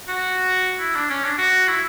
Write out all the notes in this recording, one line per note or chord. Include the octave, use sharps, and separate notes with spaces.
F#4
E4
D4
C#4
D4
F#4
E4